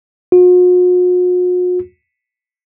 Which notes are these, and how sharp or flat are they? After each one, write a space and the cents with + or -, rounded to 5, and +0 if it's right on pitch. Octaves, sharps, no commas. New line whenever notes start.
F#4 -45